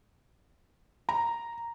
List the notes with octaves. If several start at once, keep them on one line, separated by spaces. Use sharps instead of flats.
A#5